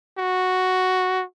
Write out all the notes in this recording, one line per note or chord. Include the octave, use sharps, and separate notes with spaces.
F#4